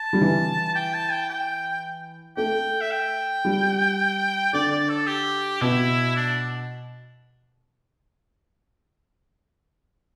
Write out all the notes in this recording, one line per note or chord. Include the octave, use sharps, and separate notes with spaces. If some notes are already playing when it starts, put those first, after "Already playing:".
Already playing: A5
G3
E3
G5
A5
G5
G5
A3 G5
E5
G5
G3
D3 D5
D5
A4
G4
B2 E4
D4